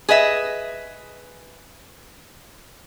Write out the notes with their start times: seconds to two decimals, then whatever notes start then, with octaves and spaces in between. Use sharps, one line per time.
0.09 G#4 B4 D#5 E5